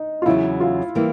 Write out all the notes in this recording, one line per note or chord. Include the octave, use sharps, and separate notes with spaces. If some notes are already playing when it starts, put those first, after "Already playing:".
Already playing: D#4
F4
E2 C#3 F#3 E4
F4
E3 G3 A#3